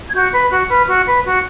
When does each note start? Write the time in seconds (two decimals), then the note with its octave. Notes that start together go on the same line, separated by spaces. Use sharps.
0.08 G#6
0.13 F#4 G6
0.32 B4 F#6
0.50 F#4 F#6
0.69 B4 F6
0.86 F#4
1.05 B4
1.23 F#4